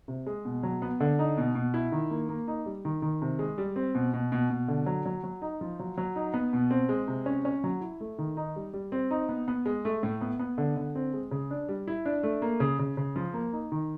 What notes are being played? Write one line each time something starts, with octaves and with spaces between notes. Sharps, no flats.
C3
G#3
B2
F#3
B3
D3
D#4
B2
B2
E4
D#3
A#3
A#3
D#4
G3
D#3
D#3
C3
G#3
G3
C4
B2
B2
B2
B2
D3
F#3
F#3
F#3
D#4
F3
F#3
F#3
D#4
B3
B2
C4
G#3
C3
C#4
C#4
F#3
E4
A3
D#3
D#4
G3
G3
C4
D#4
B3
B3
G#3
A3
A2
B3
B3
D3
D3
C4
G#3
C#3
D4
G3
E4
D4
A3
A#3
C#3
C#3
C#3
F3
A#3
D#4
D#3